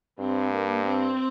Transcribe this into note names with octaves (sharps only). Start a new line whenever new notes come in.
G2 C4
A#3
C4